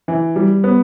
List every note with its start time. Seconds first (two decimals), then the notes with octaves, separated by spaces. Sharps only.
0.08 E3
0.36 G3
0.64 B3